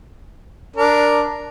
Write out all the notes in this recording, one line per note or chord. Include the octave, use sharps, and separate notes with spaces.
D4 A#4